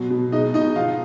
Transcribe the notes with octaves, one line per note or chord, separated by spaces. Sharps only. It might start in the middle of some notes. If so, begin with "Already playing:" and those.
Already playing: B2 F#3
B2
G#3 D#4 D#5
B2 D#4 D#5
F3 F4 F5